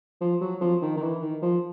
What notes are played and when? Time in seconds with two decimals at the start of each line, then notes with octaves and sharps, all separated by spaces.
0.21 F3
0.41 F#3
0.61 F3
0.82 D#3
0.97 D#3
1.02 E3
1.22 D#3
1.42 F3